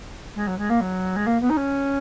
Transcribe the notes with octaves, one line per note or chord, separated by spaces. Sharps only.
G#3
F#3
G#3
A#3
F#3
G#3
A#3
B3
D#4
C#4